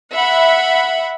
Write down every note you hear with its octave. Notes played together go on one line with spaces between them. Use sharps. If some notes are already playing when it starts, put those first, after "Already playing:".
E5 F#5 B5